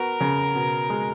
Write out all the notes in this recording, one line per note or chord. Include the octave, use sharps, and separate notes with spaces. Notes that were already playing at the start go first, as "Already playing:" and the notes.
Already playing: B3 F#4 A#4
C#3
B2
G#3